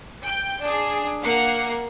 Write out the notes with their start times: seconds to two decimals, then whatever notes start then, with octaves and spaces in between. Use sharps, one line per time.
0.23 G5 G6
0.62 D4 G#4
1.22 A#3 F5 F#5